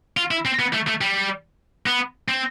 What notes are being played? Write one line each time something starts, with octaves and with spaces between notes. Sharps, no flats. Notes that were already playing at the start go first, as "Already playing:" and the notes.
F4
E4
C4
B3
A3
A3
G3
B3
C4